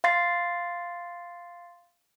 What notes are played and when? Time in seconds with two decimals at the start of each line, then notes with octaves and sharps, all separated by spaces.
0.04 F5 C6 A6 C7